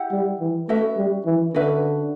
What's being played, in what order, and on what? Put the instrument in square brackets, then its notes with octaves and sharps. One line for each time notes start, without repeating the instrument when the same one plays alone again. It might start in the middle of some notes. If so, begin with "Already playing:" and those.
Already playing: [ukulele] E4 G4 F#5
[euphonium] G3
E3
[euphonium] A3 [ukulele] C#4 F#4 B4 E5
[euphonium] G3
E3
[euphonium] D3 [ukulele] C#4 F#4 B4 E5